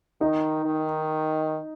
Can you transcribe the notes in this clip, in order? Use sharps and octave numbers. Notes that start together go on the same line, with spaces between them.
D#3 D#4
D#3